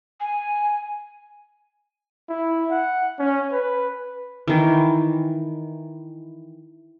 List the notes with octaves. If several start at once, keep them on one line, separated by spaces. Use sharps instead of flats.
G#5
E4
F#5
C#4
B4
D#3 E3